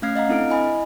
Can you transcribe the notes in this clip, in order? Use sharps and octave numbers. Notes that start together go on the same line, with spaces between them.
A3 C#4 F5 F6 G#6 C7
D#5 F5 F#5 A#5
C4 D4 E4 A4 F6 D7
E4 D#5 G#5 B5